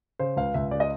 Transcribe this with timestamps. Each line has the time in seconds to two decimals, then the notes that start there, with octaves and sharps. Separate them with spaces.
0.19 C#3 C5
0.37 C#2 F5
0.54 C#2 E5
0.71 C#3 D5
0.80 D#5